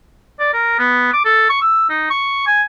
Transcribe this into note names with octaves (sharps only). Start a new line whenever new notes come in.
D5
A#4
B3
D6
A4
C#6
E6
D#4
C#6
G#5